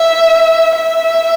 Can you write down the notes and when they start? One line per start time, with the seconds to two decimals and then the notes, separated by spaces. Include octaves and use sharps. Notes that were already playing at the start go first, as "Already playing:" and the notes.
Already playing: E5
0.76 E5